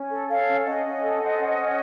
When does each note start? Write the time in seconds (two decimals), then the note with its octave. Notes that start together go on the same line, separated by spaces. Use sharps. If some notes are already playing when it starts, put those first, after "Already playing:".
Already playing: C#4
0.10 A4
0.28 A4 C#5 F5
0.47 C#4
0.65 C#4 D#5 F#5
0.83 C#4
1.02 A4
1.20 C5
1.37 C#4
1.56 C#4